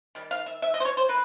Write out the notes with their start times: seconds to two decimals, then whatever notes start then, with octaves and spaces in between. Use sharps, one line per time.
0.15 D#3 G3
0.31 F5
0.46 E5
0.62 E5
0.74 D#5
0.80 C5
0.85 C#5
0.97 C5
1.09 A#3 B4